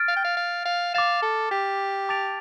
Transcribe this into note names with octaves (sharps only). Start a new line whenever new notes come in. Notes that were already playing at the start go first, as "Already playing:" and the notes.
Already playing: F6 A6 D7
F5
G5
F5
F5
F5
F5 D6 A6 E7
A4
G4
A5 D6 A6 D7 F7